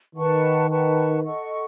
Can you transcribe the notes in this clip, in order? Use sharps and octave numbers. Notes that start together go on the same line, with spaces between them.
D#3 B4 F#5 A5 C#6
B4 F#5 A5 C#6
A4 D#5 F#5 C#6